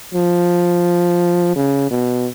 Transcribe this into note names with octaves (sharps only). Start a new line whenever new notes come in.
F3
C#3
B2